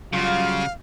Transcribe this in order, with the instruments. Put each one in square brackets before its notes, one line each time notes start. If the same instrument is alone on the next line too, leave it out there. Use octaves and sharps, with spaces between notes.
[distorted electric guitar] C#3 [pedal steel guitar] F#3 G3 F#4 [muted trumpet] F4 [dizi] F5